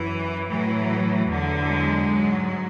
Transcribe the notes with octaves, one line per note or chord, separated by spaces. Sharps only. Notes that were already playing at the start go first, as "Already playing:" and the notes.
Already playing: F#2 E3
A2 E3 F#3
E2 D3 F#3
G#3
G#2 F#3